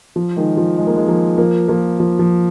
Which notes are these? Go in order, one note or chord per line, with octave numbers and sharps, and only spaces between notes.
F3
D#3 G#3
F3
G#3
A#3
D#3 G#3
F3 A#3
F3 A#3
F3 A#3
F3
F3